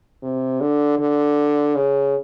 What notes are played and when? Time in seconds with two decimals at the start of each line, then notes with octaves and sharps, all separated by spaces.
0.23 C3
0.61 D3
0.99 D3
1.75 C#3